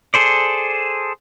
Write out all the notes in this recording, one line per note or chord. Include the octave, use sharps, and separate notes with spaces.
G#4 A4 C5 D5